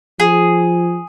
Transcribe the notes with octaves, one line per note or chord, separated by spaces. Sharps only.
F3 G#4